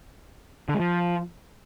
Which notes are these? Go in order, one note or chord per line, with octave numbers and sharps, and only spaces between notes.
D3
G#3
F3